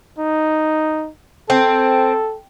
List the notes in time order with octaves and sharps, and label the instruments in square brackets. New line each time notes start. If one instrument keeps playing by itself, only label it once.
[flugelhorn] D#4
[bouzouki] C4 [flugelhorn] A4